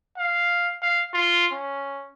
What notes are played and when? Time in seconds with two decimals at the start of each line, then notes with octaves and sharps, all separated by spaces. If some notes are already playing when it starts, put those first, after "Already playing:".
0.18 F5
0.82 F5
1.14 F4
1.52 C#4